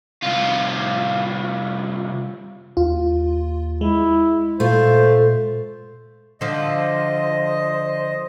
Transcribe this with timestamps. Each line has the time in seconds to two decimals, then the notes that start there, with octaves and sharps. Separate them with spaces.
0.22 C2 F4
2.77 D#2 F4
3.81 G#3 E4
4.60 A#2 A3 F4 C5
6.41 D3 F3 C5 D#5